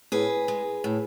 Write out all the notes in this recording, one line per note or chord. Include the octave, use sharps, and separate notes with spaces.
A2 G#4 B4
G#3
A2